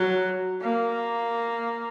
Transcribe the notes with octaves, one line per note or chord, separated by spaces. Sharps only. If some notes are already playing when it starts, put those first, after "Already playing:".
Already playing: F#3
A#3